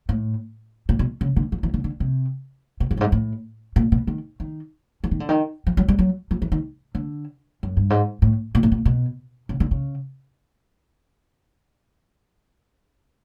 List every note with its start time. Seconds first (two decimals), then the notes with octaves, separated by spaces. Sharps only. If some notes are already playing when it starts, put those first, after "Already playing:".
0.09 A2
0.89 A#2
0.99 B2
1.21 C#3
1.36 D3
1.52 F3
1.63 E3
1.74 D3
1.84 D3
2.00 C3
2.80 B2
2.91 A2
2.97 G2
3.01 G#2
3.12 A2
3.76 A#2
3.92 B2
4.07 D#3
4.40 D#3
5.04 E3
5.11 D#3
5.20 D3
5.29 D#3
5.67 F3
5.77 F#3
5.88 G3
5.99 F#3
6.31 F3
6.42 E3
6.52 D#3
6.95 D3
7.63 F#2
7.77 G2
7.90 G#2
8.22 A2
8.55 A#2
8.63 A2
8.72 A#2
8.85 B2
9.49 C#3
9.60 D3
9.71 C#3